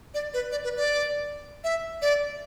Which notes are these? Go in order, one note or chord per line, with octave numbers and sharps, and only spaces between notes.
D5
B4
D5
B4
D5
E5
D5